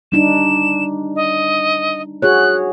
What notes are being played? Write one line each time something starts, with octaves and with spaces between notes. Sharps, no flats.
G3 D4 D#4 E7
D#5
F#4 G#4 C#5 F#6